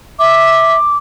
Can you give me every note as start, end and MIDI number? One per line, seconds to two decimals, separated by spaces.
0.19 0.76 76
0.19 0.97 86